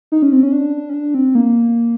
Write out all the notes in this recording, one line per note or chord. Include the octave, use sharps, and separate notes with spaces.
D#4
C#4
C4
C#4
D4
C#4
D4
C4
A#3